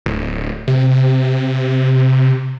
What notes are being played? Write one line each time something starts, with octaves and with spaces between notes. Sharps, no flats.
D1
C3